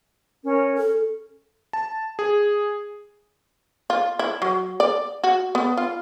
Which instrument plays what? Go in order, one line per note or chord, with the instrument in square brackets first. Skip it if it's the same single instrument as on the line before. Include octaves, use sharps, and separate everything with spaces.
[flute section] C#4 A#4
[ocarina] A4
[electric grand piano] A5
G#4
[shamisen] F4
E4
F#3
D5
F#4
B3
F4